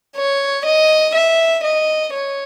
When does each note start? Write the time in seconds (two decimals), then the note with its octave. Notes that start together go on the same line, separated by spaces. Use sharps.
0.17 C#5
0.66 D#5
1.15 E5
1.64 D#5
2.13 C#5